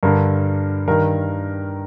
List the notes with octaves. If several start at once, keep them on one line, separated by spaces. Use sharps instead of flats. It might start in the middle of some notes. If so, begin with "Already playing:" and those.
G2 D3 A#4
G2 D#3 A#4